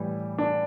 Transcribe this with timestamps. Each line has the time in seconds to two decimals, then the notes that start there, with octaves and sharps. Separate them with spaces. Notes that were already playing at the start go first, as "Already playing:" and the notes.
Already playing: A2 E3 G3
0.38 D4